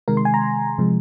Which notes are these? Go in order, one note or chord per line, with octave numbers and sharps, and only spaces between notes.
C3 D#3 G#3 A#4
C6
G#5
A#5
C3 F3 G#3